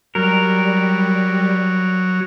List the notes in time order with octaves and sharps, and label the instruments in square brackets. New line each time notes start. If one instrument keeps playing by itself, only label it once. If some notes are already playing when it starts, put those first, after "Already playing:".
[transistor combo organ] F#3 [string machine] G3 [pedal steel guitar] A#4